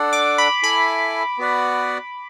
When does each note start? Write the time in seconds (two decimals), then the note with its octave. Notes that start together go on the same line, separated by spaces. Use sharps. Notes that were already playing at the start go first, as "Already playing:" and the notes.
Already playing: D4 A4 D5 F#5
0.13 D6
0.38 B5
0.63 E4 A4 E5 G#5 B5
1.38 B3 F#4 B4 D5 F#5